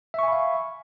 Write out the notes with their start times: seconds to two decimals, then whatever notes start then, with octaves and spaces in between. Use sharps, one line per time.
0.14 E5
0.19 C#6
0.23 G#5
0.28 B5
0.32 F5